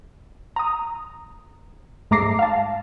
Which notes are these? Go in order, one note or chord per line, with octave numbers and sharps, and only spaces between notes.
A#5 D#6
G#2 A3 A#5 D6 A#6 C7
F5 A5